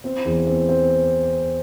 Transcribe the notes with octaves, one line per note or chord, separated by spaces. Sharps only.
C4
E2
C4
C4